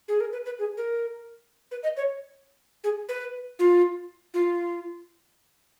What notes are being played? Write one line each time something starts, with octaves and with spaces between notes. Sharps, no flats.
G#4
A#4
B4
B4
G#4
A#4
B4
D#5
C#5
G#4
B4
F4
F4